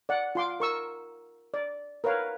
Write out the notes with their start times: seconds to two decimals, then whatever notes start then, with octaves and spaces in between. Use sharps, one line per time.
0.09 D5 F#5
0.35 F4 C6 D6
0.60 A#4 C#6 E6
1.54 D5
2.04 A#4 B4 C#5 F5